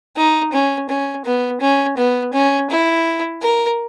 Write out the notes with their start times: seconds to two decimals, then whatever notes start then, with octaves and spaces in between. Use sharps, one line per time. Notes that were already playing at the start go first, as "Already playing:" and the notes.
0.16 D#4
0.52 C#4
0.89 C#4
1.25 B3
1.61 C#4
1.97 B3
2.33 C#4
2.70 E4
3.42 A#4